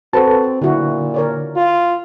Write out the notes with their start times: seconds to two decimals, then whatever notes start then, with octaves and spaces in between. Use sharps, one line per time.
0.13 C4 F#4 A4 B4 C5 A5
0.62 A#2 D3 E4 F#4
1.14 A#4 C#5 D5
1.56 F4